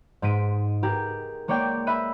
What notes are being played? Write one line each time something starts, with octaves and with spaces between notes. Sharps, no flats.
G#2 G#3 B6 D7 D#7
G4 G#4 A#4
G#3 A#3 C#5 D5 G5
E5 B5 F#6 D#7